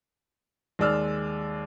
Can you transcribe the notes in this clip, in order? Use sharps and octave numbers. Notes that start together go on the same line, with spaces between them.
D#2 G#3 D5 E6 F6